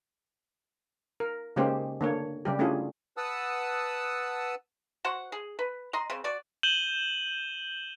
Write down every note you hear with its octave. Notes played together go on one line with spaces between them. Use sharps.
A#4
C#3 G#3 A#3 C#4 G4 C5
D3 A#3 C#5
C#3 G3 G4
A3 C#4 D4 E4 F4 G#4
B4 F#5 A5 D#6 E6
F#4 C5 F#5
G#4
B4
D#5 A#5 C6
C#3 C4
F#4 D5
G6 D#7 E7 F#7 G7